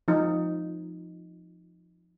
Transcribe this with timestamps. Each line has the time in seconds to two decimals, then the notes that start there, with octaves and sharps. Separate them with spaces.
0.08 F3 D#4